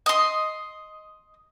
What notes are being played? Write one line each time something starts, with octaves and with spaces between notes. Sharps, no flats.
D#5 C6